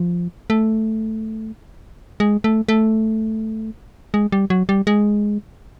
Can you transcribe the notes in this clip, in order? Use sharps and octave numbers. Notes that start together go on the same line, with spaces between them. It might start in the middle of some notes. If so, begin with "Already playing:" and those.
Already playing: F3
A3
G#3
A3
A3
G#3
G3
F#3
G3
G#3